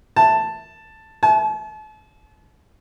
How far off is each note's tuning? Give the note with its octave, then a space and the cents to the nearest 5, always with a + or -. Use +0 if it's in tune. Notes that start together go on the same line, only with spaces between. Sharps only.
A5 +5
A5 -40